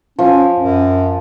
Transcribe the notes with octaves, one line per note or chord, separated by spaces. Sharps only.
F3 C#4
F#2